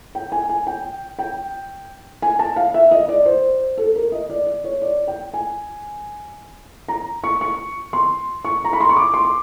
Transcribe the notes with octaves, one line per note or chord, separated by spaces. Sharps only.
G5
G#5
G#5
G5
G5
G#5
A5
F5
E5
D#5
D5
C5
A4
A#4
D#5
D5
D5
C#5
D5
G5
G#5
A#5
C#6
C#6
C6
C#6
A#5
B5
C6
C#6
D6
C6
D6